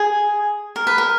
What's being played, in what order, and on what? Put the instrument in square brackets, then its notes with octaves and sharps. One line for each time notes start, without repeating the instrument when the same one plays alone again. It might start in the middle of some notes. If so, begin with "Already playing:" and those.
Already playing: [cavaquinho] G#4
A#4
B4
A#4